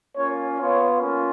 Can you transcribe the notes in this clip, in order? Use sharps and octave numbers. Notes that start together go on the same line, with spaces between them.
A#3 C#4 F4 C#5
B3 F4 C#5
A#3 C#4 F4